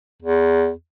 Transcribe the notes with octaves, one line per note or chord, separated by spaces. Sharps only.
E2